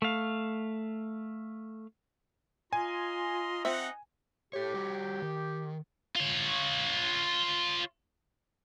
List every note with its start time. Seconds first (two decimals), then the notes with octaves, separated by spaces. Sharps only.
0.02 A3 F5
2.73 F4 D#5 G#5 A#5 C6
3.65 C4 D#4 E5 F#5
4.53 G4 A4 C#5
4.74 G3 F#4
5.22 D#3
6.16 F4 C#5